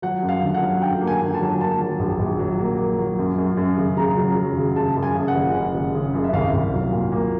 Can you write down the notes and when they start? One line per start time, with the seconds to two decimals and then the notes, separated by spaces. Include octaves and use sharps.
0.02 F#3 F#5
0.23 F#2
0.29 F5
0.42 D3
0.54 F#5
0.61 F#3
0.82 D3 G5
1.01 A#3
1.07 G#5
1.21 D3
1.34 A5
1.41 F#3
1.60 A#3 A5
1.80 F#3
1.99 A#1
2.19 A#1
2.39 F#3
2.59 A#3
2.78 A#3
2.98 F#3
3.19 F#2
3.38 F#2
3.57 F#2
3.77 C#3
3.97 C#3 A#5
4.17 F#3
4.36 F#3
4.57 C#3
4.76 C#3 A5
4.96 F#2
5.03 G#5
5.15 C#3
5.28 F#5
5.35 F#1
5.55 F#1
5.75 F#1
5.95 C#3
6.13 F#2
6.24 E5
6.33 C2 F5
6.53 C2
6.74 F#3
6.93 A#2
7.12 A#3